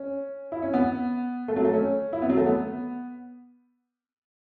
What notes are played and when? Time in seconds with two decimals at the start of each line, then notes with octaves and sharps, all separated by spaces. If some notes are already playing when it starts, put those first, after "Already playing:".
Already playing: C#4
0.52 E4
0.62 C#4
0.74 B3
1.48 A3
1.56 F#3
1.64 A3
1.73 C#4
2.13 E4
2.22 B3
2.29 F#3
2.37 A3
2.46 B3